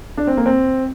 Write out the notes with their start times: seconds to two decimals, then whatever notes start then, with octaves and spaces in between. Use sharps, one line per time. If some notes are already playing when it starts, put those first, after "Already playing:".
0.17 D4
0.27 C4
0.37 A#3
0.46 C4